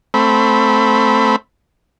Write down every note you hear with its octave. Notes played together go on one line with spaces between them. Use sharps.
A3 C4 B5